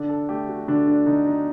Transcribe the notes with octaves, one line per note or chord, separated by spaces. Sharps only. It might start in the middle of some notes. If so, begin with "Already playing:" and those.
Already playing: D3 D4
A4
A3 G4
F#4
D3 D4
D4
D3 D#4
D#4